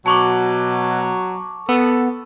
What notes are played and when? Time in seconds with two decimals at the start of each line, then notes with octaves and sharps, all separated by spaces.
0.06 B2 F#3 A5 C#6 D6
1.69 B3 A4